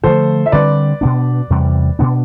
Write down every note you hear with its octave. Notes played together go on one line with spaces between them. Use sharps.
D3 F3 A3 A4 C5
E5
D3 G3 C4 B4 D5
B2 B3 D4
E2 C3 G3
B2 B3 D4